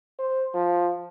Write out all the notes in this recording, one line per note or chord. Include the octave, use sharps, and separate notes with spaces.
C5
F3